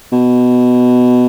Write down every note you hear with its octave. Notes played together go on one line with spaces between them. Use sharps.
B2